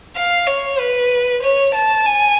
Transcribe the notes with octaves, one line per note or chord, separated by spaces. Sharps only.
F5
C#5
B4
C#5
A5
G#5